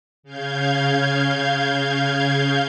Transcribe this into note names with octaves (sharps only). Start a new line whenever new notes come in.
C#3 F5 G6 G#6